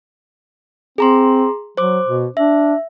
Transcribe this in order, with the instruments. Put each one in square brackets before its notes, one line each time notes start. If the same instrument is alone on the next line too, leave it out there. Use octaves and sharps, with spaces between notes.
[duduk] C4 [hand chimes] G#4 A#5 C6
[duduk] F#3 [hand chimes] C5 D6
[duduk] B2
[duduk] D4 [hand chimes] E5